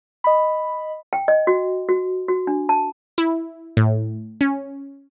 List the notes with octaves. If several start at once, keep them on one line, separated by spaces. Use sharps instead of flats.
D#5 B5
G5
D#5
F#4
F#4
F#4
D4
A5
E4
A2
C#4